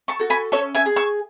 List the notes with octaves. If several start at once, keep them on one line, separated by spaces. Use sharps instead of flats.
A5 C#6
F#4 A4
G#5 B5
C#4 A4 C#5
E5 G#5
G#4
C#6 E6